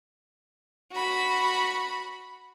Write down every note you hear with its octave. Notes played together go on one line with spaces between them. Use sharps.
F#4 B5